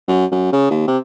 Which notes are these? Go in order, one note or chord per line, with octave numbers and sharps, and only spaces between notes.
F#2
F#2
C#3
D#2
C3